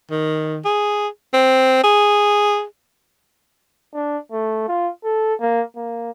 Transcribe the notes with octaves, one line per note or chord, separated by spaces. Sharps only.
D#3
G#4
C4
G#4
D4
A3
F4
A4
A#3
A#3